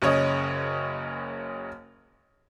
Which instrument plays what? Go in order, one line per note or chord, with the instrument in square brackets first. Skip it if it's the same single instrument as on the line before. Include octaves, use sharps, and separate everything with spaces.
[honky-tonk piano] F#1 C#3 C#5 D#5